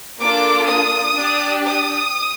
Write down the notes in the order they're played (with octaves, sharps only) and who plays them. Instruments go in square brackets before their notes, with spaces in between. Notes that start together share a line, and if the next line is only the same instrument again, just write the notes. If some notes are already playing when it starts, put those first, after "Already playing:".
[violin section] A#3 D4 F4 A4 D6
D#6
D4 G4
D#6